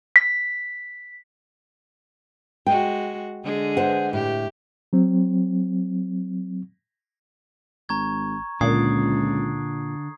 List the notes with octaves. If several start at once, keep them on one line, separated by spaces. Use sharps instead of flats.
B6
G#3 F#4 G5
D3 G#3 G#4
C5 F#5
A2 G4
F#3 C4
G#1 A#5 C#6 G#6
C#2 A#2 D3 D#6 G#6 C7